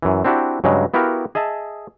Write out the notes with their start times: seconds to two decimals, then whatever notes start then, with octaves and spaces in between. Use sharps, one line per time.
0.02 F#2 E3
0.25 C4 D4 E4 F#4 G4
0.64 G2 C#3 F#3 G#3
0.94 B3 E4 F#4 G4 A#4 F5
1.35 G#4 D#5 E5 A5